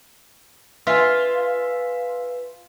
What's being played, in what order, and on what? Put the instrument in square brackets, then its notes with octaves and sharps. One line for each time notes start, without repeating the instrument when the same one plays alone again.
[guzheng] F4 [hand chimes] B4 [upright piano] E5 G#5 [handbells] F5 B6